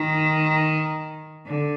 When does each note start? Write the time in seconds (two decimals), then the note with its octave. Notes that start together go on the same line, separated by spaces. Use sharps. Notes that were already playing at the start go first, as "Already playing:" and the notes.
Already playing: D#3
1.46 D3